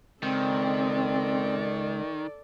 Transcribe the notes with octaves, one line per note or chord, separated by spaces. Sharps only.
C#2 D#3 C4 A4 D5